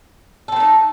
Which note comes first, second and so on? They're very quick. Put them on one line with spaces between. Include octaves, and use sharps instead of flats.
A4 C4 A3 D#4